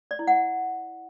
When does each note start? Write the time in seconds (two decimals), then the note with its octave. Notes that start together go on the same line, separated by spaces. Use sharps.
0.11 D5
0.19 E4
0.27 F#5